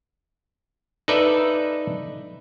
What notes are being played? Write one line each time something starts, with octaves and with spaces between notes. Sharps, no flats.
D#4 A4 B4 D5 E5